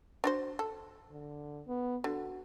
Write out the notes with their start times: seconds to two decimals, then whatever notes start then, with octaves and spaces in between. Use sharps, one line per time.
0.24 D4 F#4 C5
0.59 A4
1.11 D3
1.67 B3
2.04 D3 F#4